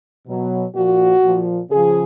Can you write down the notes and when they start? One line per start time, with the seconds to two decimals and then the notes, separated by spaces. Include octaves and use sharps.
0.27 B2 F#3
0.75 A#2 F3 F#4
1.23 A#2 F3
1.70 C#3 G#4
1.76 F3